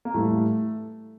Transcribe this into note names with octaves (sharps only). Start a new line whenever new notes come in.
A#3
A2 E3 G3 A3